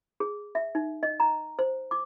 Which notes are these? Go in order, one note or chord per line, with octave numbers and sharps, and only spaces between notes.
G#4
E5
D#4
D#5
A#5
C5
D6